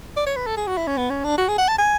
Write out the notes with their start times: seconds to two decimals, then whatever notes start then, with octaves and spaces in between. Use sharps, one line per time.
0.16 D5
0.26 C#5
0.36 B4
0.47 A4
0.57 G#4
0.67 F#4
0.77 E4
0.87 C#4
0.97 B3
1.10 C#4
1.24 D4
1.38 F#4
1.48 G#4
1.58 F#5
1.68 A5
1.78 G#5